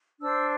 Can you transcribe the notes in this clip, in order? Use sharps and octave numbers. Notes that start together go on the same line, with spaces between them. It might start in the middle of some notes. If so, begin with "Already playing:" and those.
D4 C5 E6